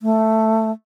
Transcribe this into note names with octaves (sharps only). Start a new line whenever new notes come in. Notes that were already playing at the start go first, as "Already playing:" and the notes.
A3